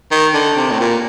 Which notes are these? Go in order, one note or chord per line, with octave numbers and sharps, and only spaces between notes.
D#3
D3
C3
A2
A#2